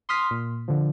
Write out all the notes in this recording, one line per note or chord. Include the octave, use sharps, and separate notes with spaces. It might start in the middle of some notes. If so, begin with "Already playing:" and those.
C6 D#6 F6 B6
A#2
D3 F3